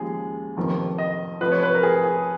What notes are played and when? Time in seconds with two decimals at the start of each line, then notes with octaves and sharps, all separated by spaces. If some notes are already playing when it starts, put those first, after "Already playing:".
Already playing: D#2 C#3 F3 G#3 G#4
0.57 F1 F2 D#3 A#3
0.98 D#5
1.41 F1 F2 F3 B4
1.52 C#5
1.63 B4
1.75 A#4
1.83 G#4
2.04 G#4